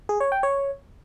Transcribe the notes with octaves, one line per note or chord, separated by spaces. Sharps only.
G#4
C#5
G5
C#5